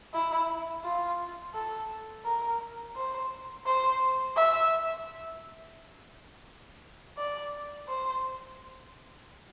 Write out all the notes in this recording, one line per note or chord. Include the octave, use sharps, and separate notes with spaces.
E4
F4
A4
A#4
C5
C5
E5
D5
C5